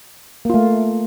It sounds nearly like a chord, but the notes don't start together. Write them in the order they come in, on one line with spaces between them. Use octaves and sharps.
A#3 F4 A3